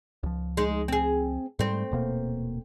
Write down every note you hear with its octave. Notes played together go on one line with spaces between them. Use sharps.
C#2 F3
G#3 D#4
C4 G#4
G#2 G3 A3 C4
D#1 B2 A#3